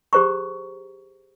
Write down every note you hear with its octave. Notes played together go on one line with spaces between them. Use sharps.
G4 G#4 C5 A#5 C#6